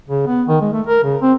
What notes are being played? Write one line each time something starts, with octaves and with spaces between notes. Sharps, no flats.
C#3
B3
D#3
G#3
A3
A#4
C#3
C4